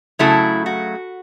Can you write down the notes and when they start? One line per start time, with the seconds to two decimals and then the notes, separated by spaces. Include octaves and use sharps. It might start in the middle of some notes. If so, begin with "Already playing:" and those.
0.19 C#3 F#3 A3 E4
0.66 F#4